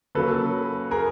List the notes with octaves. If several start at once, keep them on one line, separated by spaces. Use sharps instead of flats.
C#3 F#3 A#3 A4 B4
G#4 A#4